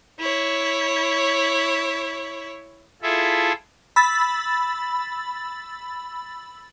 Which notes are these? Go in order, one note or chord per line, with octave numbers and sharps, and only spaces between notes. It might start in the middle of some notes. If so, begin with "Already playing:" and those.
E4 C#5
E4 F4 G#4 A4 E5
B5 E6 A6